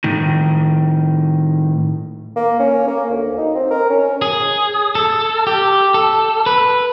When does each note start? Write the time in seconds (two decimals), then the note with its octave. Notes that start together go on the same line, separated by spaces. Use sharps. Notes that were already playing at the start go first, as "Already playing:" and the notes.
0.04 A2 D#3
2.36 A#3
2.60 C#4
2.88 A#3
3.11 D2
3.38 D#4
3.56 C4
3.71 A#4
3.90 C#4
4.22 G#4
4.95 A4
5.47 G4
5.94 A4
6.46 B4